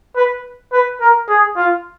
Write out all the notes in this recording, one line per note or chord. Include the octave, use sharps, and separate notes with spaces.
B4
B4
A#4
G#4
F4